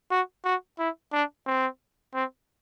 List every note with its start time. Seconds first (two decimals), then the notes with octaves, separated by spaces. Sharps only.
0.11 F#4
0.45 F#4
0.79 E4
1.13 D4
1.46 C4
2.14 C4